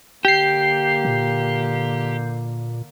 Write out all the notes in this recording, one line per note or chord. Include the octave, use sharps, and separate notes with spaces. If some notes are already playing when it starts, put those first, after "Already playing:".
D3 A#3 G4 G6 C7
A#2